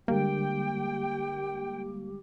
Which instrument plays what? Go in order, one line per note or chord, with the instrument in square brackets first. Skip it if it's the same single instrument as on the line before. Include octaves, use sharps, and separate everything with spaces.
[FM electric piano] D3 G3 G#3 [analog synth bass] A#3 [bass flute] G4 [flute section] G5